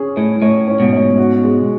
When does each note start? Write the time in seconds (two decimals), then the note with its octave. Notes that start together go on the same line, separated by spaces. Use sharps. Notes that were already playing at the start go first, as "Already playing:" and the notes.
Already playing: C#4 G#4
0.17 A2 C#5
0.42 A2 C#5
0.67 C#4
0.80 G#2 B2
0.93 C#5
1.18 F#4
1.44 G#3